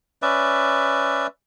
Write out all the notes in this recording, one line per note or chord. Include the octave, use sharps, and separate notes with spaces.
C#4 B4 D5 E5